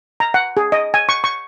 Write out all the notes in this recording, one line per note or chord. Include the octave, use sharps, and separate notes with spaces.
A#5
F#5
G#4
D#5
G#5
C#6
C#6